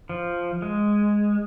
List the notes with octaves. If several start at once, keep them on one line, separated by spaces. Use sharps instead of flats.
F3
G#3